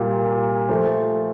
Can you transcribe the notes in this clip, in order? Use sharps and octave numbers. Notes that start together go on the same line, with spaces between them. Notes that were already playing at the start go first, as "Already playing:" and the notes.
Already playing: C2 A#2 F4 G4
F3 A3 C5